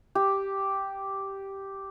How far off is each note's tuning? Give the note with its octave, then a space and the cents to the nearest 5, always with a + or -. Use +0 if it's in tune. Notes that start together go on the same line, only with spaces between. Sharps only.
G4 -5